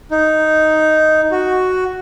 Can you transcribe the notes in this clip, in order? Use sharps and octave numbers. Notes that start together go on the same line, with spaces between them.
D#4
F#4